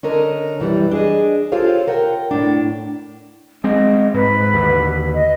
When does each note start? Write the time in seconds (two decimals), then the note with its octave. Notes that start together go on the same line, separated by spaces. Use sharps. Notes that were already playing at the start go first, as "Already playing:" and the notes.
0.03 D3 C#4 D4 A4 A#4 D#5
0.60 F#2 E3 G3
0.91 D4 G#4 D#5
1.52 F4 G4 A4 C5 C#5 F5
1.88 A#4 F#5 G5
2.31 A2 D4
3.64 G#3 C4 D#5
4.14 G#2 B4
4.53 D#2 D3
5.14 D#5